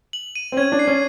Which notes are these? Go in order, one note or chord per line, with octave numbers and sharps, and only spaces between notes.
F#7
D#7
C4
C#4 G#6
D4
C7
C#4